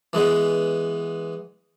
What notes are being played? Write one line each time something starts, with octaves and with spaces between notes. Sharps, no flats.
E3 G#3 B3